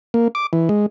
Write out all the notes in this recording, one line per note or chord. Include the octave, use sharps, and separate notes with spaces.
A#3
D6
E3
G#3